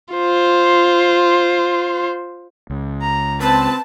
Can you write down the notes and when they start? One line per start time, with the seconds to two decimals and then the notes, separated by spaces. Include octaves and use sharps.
0.14 F4 C5
2.70 C#2
3.01 A#5
3.41 C4 B4 A5